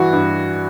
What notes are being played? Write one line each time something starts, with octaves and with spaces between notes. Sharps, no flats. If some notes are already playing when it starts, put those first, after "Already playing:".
Already playing: G2 E3 F#4
G2